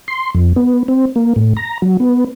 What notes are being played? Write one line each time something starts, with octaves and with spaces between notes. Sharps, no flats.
C6
F2
B3
C4
A#3
A2
A#5
F#3
B3